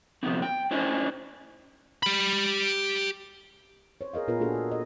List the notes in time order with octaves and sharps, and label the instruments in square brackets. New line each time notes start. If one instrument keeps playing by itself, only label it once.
[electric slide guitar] C3 F3 B3 C4
G5
C#4 D4 E4 C5 D#5 G#5
[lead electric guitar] G4 B5
[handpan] C5 C#5
G#4 A#4 D#5 F5
A#2 B3 F4 G#4 A#4 B4
A#3 D4 F#4 G#4 A4
F#4
D#5